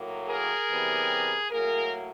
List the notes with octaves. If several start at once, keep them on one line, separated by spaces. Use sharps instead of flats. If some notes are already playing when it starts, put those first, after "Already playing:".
Already playing: A2 F#3 A#3
G#4 A#4
C3 E3 G3 B3
A2 F#3 A#3 G#4 A#4